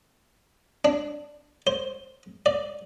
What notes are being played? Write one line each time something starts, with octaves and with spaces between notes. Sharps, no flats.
D4
C5
D5